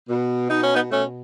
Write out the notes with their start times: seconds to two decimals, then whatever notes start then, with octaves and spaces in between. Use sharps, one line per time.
0.09 B2
0.50 B2 D#4
0.63 C#4
0.75 B3 D#4
0.91 B2 A3 C#4